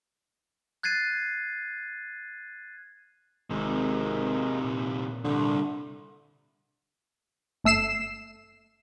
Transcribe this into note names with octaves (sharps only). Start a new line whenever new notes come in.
F#6 G#6 A6 C7 D#7
G#1 C3 D#3 D#4 G#4 A#4
A#2
C2 F2 D3
G1 A3 E6 C7 E7